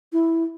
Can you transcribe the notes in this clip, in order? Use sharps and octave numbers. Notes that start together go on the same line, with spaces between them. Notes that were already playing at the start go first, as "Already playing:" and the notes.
E4